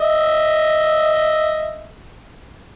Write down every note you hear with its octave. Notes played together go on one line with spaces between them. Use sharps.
D#5 E5